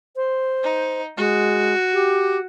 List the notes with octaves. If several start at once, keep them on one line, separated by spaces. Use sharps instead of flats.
C5
D#4
G#3 F#4
G4